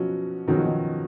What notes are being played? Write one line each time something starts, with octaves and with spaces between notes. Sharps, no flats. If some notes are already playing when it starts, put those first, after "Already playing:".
Already playing: B2 F3 F#3 C#4 F#4
B2 D#3 F#3 C#4 F#4
F3
D#3